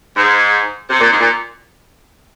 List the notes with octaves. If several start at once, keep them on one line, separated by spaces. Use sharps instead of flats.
G#2
C3
A#2
G#2
A#2